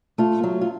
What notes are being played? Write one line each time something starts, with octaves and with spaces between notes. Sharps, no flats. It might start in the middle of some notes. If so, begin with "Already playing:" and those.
A3 F4
F#3
F4